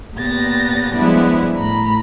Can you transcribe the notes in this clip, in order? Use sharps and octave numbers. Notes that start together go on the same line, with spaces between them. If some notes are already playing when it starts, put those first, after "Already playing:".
A#2 B3 G4 A6 A#6
F3 G3 G#3 B3 D4 E4
A2 A#5 B5